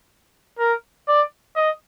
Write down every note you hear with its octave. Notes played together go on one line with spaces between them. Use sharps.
A#4
D5
D#5